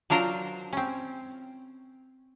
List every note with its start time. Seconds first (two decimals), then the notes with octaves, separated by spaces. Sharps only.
0.10 F#3 D4 F4 A#4 C5
0.73 C4 C#4